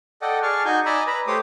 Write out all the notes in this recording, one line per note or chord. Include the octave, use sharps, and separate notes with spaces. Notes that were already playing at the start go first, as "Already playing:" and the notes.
A4 D5 D#5 F#5 G5
G#4 D5 A5 C#6 F6
D#4 F#4 G#5 C#6 G6
D5 D#5 G#5 A#5 B5 E6
B4 A#5 B5
A3 G4 C5 C#5 D6 D#6